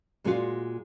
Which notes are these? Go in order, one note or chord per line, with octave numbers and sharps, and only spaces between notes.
A#2 G#3 F4 F#4 D5 F5